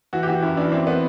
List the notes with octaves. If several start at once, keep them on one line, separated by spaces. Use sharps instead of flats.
E3 F#4
G4
E3 F#4
F#2 E4
E3 D4
E3 C4
B3